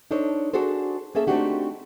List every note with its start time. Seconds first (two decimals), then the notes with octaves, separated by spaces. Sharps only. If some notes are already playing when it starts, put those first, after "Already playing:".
0.11 D4 D#4 A4 C5 C#5
0.54 D4 F#4 G#4 A4 C5
1.15 A#3 C#4 G#4 A4 E5
1.27 A3 C4 D4 D#4 F#4 G4